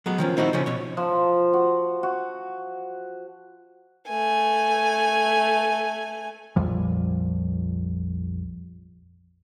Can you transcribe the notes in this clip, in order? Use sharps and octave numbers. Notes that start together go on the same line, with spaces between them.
F#3 G#3 B3
D#3 F3 C#4
C4 D#4 E4 F#4
C#3 F3 C#4
B2 C#5
F3
F#4
F#4
A3 G#5
A#1 F2 F3 G3